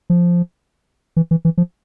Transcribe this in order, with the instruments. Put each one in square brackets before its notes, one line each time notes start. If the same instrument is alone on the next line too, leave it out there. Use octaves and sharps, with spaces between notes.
[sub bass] F3
E3
E3
E3
F3